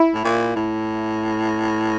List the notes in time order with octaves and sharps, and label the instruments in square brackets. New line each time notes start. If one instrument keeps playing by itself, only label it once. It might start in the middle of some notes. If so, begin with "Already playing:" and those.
Already playing: [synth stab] E4
[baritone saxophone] A2
A#2
A2